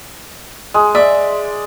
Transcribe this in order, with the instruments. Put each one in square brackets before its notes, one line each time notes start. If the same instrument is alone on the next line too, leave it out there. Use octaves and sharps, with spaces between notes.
[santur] G#3 [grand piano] D#6
[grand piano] D5 [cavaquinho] E5